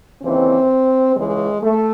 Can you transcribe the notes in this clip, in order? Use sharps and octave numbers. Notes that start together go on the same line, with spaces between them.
D#2 C#3 E3 C4
C#2 C#3 E3 G#3
A3